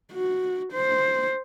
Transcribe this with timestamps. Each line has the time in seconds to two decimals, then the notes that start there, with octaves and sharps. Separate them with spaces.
0.13 F#4
0.73 C5